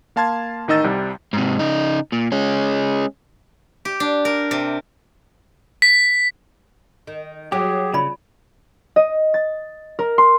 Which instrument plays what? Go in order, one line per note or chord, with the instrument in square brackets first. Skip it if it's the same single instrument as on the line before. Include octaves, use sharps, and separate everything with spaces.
[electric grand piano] A#3 F5 A5 C6 G#6 A6
A1 D#3 D#4 D#5 E6 A6
C2 C3 G3
[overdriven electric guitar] G#2 C3
C#3 D#4
A#2
G#3 C#4
[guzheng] G4
D4
A#4
C3
[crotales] B6
[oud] D#3
[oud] F#3 [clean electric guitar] G4 [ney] G#4
[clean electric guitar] C#3 [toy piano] F4 D5 B5
[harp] D#5
A6
A#4
C6